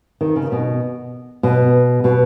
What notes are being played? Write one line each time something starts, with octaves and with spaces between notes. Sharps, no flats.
D#3
C#3
B2
B2
B2